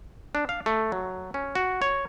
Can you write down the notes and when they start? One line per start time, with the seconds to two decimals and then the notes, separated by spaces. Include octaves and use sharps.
0.35 D4
0.49 F5
0.66 A3
0.92 F#3
1.34 C#4
1.55 F#4
1.82 C#5